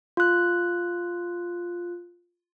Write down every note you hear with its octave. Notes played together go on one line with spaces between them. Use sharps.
F4 F#6